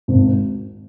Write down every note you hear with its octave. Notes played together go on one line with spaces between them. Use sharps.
G#1